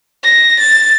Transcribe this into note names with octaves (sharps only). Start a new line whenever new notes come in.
A#6
A6